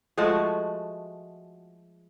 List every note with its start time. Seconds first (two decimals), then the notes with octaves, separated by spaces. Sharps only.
0.18 F3 G#3 A3 F#4